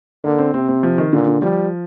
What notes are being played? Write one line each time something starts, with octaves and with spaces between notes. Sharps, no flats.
D3 A#3
C4
C3 C4
C4
F3
D#3
A#2 D3
D3
F3 G3